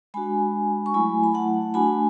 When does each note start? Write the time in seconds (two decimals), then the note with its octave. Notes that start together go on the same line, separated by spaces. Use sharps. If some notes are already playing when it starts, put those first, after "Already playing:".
0.14 G#3 D4 F#4 G#5 B5
0.86 C#6
0.94 F#3 A3 E4 G#5 B5
1.24 B5
1.34 F#5 A5
1.74 A3 D4 F#4 G#5 B5